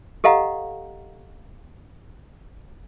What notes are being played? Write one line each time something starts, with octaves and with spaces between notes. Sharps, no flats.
G4 A4 D#5 F5 F#5 A#5